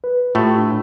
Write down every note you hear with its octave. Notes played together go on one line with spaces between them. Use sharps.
B4
A2 A3 F4 G4
D4